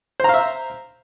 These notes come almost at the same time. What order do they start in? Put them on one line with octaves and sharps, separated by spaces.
C5 A#5 F5 E5